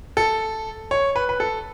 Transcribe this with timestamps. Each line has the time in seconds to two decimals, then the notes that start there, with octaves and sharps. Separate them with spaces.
0.17 A4
0.91 C#5
1.16 B4
1.29 B4
1.40 A4